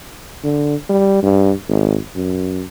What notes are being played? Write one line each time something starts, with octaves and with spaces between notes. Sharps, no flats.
D3
G3
G2
G#1
F#2